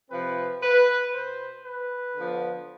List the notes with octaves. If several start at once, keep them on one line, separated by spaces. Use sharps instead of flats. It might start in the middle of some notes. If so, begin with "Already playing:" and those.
C3 F3 C4 B4
B4
B2 B3 C5
B4
D3 F3 B3